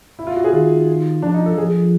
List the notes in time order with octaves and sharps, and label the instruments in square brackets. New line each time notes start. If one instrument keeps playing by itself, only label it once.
[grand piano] E4
F4
F#4
G#4
[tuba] D#3 [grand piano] F4
[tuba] F3 [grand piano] D4
[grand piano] D#4
A4
[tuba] F3 [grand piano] G#4